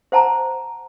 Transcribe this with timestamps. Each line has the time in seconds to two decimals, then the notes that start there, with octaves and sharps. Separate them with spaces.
0.12 C5 F#5 A5 A#5